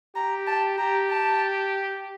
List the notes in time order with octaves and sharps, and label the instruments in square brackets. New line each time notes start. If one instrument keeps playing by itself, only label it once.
[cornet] G4 [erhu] A#5
[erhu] A5
[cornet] G4 [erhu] A#5
[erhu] A5